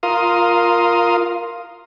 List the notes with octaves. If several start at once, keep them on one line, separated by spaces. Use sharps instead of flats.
F4 A#4 F5 C6 D#6